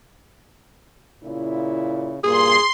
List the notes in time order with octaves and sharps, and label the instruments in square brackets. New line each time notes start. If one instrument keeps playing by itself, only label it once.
[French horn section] A#2 C#3 E4
[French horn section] G2 A#2 [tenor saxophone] G#4 [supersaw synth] C6